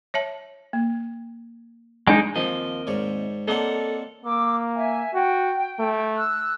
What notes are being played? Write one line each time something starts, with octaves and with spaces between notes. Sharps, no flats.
C#5 E5 A5
A#3
G#3 D4 D#4 G#5
D#2 F3 C4 A#4 D#5
G#2 C#5 D5
A#3 C4 D4 A4 C#5 D#5 F#5
A#3 D6 E6
E5 G#5
F#4 G5
A3
E6 F#6